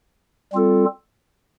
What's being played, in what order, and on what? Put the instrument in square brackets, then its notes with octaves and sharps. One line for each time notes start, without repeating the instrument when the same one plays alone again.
[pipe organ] G3 C4 F4 A4